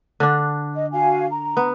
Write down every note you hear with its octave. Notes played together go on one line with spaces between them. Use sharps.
D3 D4
D#5
F#4 F5 G#5
A#5
B3